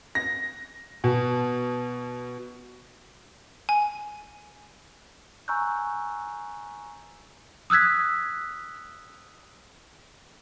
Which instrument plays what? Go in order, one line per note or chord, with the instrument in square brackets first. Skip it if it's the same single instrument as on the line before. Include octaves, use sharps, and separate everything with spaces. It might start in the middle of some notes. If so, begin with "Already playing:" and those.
[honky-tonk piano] A#6
B2
[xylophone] G#5
[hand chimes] G#5 A#5 C#6 E6 F#6 G6
[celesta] D#6 E6 F#6 G#6 B6